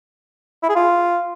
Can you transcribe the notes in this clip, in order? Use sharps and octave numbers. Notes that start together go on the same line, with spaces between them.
E4
G#4
F4